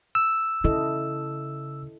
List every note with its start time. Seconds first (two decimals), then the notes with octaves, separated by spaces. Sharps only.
0.15 E6
0.64 C#3 E4 A4 D#5